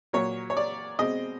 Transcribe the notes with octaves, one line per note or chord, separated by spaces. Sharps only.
A#2 F#3 A#3 C#5
C#5
D5
B2 G#3 C4 D#5